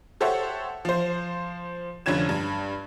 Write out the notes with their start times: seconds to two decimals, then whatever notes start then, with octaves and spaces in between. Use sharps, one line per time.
0.21 G4 A4 C5 C#5 E5 F#5
0.85 F3 C5
2.06 F1 D3 F3 C#4 G#6 E7
2.29 G2